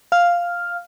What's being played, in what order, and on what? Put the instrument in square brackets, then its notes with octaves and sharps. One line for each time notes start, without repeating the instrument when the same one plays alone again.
[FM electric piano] F5 F6